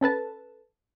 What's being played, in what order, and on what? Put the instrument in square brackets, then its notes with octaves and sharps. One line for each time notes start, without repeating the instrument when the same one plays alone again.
[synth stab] C#4 A4 B4 A5